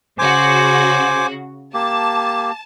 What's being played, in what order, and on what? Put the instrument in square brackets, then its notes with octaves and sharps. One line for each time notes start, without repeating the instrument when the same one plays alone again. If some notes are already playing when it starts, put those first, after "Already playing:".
[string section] C#3 F#4 [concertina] C5 G#5 D6
[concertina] A#3 G4 [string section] A5